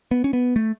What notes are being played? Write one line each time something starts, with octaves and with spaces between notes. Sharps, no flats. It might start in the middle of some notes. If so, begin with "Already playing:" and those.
B3
C#4
B3
A3